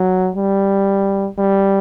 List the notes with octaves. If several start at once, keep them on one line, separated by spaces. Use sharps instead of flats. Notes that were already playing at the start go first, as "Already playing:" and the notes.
Already playing: F#3
G3
G3